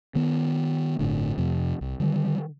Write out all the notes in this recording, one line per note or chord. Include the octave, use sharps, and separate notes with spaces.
D#3 B3
G1 A2 D3
F2 C3
C2
D3 D#3 G3